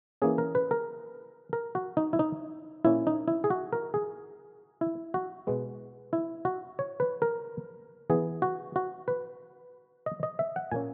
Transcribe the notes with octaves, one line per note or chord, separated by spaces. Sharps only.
E3 A#3 C#4 G#4
A#4
B4
A#4
A#4
F#4
D#4
E4
D#4
A#2 A#3 C#4 E4
D#4
E4
G#4
F#4
A#4
G#4
E4
F#4
B2 G#3 B3
E4
F#4
C#5
B4
A#4
E3 B3 G#4
F#4
F#4
B4
D#5
D#5
E5
F#5
A#2 A#3 C#4 G#5